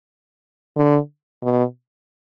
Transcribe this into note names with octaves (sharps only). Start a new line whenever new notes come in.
D3
B2